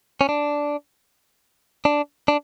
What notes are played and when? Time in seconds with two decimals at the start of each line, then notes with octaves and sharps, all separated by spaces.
0.21 C#4
0.29 D4
1.85 D4
2.28 D4